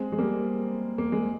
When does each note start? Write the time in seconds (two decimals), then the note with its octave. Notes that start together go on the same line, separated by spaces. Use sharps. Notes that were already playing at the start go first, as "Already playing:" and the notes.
Already playing: G#3 C4
0.12 G#3
0.18 G3 A#3
0.98 A#3
1.12 G#3